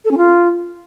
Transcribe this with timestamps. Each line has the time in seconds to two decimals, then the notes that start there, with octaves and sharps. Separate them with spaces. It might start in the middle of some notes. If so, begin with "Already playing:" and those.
0.05 A4
0.11 C#4
0.18 F4